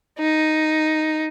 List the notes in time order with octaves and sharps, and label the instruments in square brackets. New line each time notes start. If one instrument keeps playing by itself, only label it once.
[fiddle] D#4